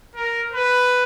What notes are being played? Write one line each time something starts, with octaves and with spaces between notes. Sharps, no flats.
A#4
B4